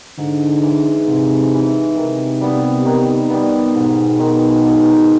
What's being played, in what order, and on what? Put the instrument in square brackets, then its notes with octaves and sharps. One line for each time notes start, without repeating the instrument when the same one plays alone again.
[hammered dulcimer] G#2 [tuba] D3
[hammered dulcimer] E3 G#3
[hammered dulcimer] G#2 [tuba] C3
[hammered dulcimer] E3 G#3
[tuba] C3 [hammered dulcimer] D#3
[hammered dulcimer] G3 B3
D#3
G3 B3
[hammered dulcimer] G#2 [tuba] B2
[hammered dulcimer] D#3 G#3
G#2